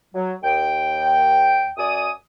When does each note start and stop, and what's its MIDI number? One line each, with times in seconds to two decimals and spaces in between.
0.15 0.33 54
0.43 1.71 39
0.43 1.71 79
1.78 2.09 42
1.78 2.09 74
1.78 2.09 80
1.78 2.09 87